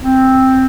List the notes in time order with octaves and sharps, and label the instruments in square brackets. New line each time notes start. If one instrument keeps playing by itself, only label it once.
[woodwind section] C4